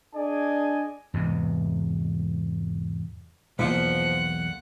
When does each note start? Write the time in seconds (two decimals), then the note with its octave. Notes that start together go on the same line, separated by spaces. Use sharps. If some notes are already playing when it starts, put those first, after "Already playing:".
0.15 D4 G#4 D5 D#5 G#5
1.14 E2 G#2 C3
3.59 B1 E2 A#2 F3 F5 F#5 B5